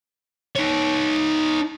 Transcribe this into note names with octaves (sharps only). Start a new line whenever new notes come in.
D#4 C#5